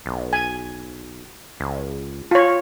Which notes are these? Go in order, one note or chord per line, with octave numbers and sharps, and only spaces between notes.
B1
G#5
C#2
F4 C#5